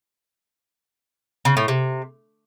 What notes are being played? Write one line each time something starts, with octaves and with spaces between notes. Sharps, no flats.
C#3
A2
C3